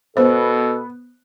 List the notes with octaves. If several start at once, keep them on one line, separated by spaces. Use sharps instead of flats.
B2 B3 A4 C5